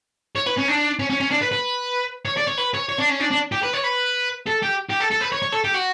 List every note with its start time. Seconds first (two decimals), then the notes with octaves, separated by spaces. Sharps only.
0.36 C#5
0.46 B4
0.57 C#4
0.68 D4
0.99 C#4
1.10 C#4
1.20 C#4
1.31 D4
1.41 B4
1.52 B4
2.25 C#5
2.37 D5
2.47 C#5
2.57 B4
2.74 C#5
2.89 C#5
2.99 D4
3.10 C#4
3.20 D4
3.31 D4
3.52 G4
3.63 B4
3.74 C#5
3.84 B4
4.47 A4
4.63 G4
4.90 G4
5.01 A4
5.11 A4
5.21 B4
5.32 C#5
5.42 C#5
5.52 A4
5.64 G4
5.74 F#4